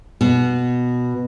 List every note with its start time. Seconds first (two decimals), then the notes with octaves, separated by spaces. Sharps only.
0.21 B2